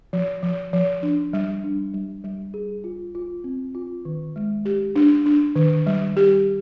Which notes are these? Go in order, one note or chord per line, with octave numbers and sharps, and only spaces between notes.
F3
F3
F3
D4
G3
D4
G3
G3
G#4
F4
F4
C4
F4
D#3
G#3
G4
D4
D4
D#3
G3
G4